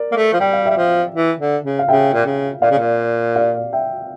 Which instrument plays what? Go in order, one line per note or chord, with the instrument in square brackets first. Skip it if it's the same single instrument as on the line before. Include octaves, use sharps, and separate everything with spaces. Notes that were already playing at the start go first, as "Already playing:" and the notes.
Already playing: [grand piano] A#4 D5
[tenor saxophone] A#3
A3
F3
[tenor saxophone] G3 [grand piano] G5
[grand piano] F5
[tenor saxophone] G3 [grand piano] E5 G5
[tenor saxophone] F3
E3
D3
C#3
[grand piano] F5
[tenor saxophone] C#3 [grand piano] E5 G5
[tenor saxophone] A#2
C#3
[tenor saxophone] A#2 [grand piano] D5 F5
[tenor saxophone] C#3
A#2
[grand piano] D5 F5
E5 G5